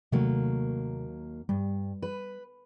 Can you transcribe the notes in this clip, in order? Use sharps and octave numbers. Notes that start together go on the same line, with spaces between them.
D#2 C3 F#3 A3 A#3
G2 G3
B4